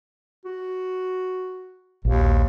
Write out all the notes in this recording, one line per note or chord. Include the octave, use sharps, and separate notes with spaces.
F#4
A#1 D#2